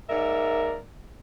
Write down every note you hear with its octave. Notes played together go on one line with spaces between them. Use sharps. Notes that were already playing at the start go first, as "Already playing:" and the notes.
G#2 A#3 A#4 D5 E5